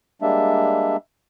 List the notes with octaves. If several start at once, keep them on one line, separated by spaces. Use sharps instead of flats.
G3 G#3 A#3 D4 E5